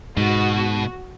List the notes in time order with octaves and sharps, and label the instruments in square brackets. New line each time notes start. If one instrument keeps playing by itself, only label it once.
[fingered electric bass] G#2 [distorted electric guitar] B2 [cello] F#4